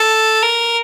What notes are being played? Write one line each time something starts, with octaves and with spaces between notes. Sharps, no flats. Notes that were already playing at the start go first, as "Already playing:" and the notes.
Already playing: A4
A#4